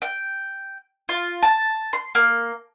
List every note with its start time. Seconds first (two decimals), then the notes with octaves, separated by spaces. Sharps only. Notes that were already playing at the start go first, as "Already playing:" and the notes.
0.02 G5
1.09 F4
1.42 A5
1.93 C6
2.15 A#3